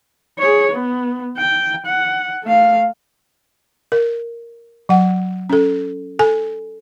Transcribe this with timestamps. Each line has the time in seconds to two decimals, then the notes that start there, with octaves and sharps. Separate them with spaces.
0.38 G#4 C#5
0.72 B3
1.37 G5
1.86 F#5
2.44 A3 F5
3.92 A#4
4.89 F#3 F#5
5.50 C#4 A4
6.19 A4 G#5